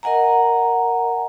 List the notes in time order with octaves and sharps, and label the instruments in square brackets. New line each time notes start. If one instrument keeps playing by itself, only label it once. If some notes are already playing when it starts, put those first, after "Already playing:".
[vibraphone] A#4 D#5 F#5 G#5 A#5